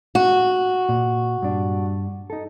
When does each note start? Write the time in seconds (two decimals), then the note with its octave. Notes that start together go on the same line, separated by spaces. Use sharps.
0.15 F#4
0.89 A#2
1.42 G2 D4
2.30 D#4 A4